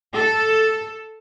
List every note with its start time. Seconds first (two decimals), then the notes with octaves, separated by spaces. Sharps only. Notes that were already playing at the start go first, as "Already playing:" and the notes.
0.16 A4